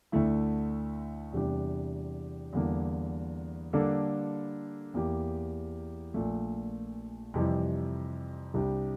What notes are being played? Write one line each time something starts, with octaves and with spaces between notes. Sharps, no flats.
D2 D3 A3 E4
E2 C3 G3 D4 G4
E2 D3 G3 A#3 E4
D3 G3 A#3 D4 A4
E2 E3 A#3 E4 G4
A#1 A#2 A3
F2 C3 E3 G3
C2 C3 G3 D4 G4